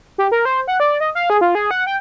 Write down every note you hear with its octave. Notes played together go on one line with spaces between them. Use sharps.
G4
A#4
C5
F#5
D5
D#5
F5
G#4
F4
G#4
F#5
G5